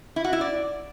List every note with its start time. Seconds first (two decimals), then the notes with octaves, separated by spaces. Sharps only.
0.16 E4
0.24 F#4
0.33 E4
0.41 D5